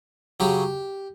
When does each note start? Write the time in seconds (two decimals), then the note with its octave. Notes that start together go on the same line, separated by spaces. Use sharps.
0.40 C#3 F#3 G4